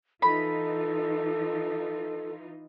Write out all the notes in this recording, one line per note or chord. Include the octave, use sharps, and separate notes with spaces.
E3 D#4 F4 A4 B5